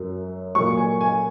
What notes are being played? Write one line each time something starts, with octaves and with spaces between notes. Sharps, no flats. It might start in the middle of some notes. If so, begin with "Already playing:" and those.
Already playing: F#2 F#3
A#2 F#3 C#6
G#5
G#5